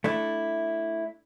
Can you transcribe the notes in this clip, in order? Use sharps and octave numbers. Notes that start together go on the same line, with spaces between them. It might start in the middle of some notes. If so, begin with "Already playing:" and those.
A3 D4 E4